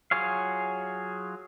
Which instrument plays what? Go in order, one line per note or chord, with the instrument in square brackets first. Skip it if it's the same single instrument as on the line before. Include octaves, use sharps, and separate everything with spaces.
[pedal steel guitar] F#3 F4 G#4 C#5 F5